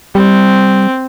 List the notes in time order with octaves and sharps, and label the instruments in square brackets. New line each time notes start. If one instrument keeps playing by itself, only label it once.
[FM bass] G3 [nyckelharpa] C4